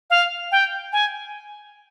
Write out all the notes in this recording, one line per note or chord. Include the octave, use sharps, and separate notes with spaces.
F5
G5
G#5